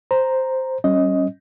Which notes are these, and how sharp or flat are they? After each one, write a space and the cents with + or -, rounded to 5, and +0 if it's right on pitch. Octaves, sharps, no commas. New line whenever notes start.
C5 +0 A#5 +0
G3 -35 C#4 -20 D#5 +10